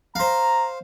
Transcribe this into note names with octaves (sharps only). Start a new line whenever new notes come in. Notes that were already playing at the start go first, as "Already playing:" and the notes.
C5 F5 A#5